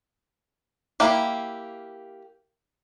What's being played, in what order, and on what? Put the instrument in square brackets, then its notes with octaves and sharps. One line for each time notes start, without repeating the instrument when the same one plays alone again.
[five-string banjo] A#3 E4 G4